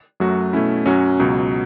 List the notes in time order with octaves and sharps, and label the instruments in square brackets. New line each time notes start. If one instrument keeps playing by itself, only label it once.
[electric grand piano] F#2 F#3 A3 F#4
B2 A3 C#4 E4
F#2 F#3 C#4 F#4
C#2 B2 F#3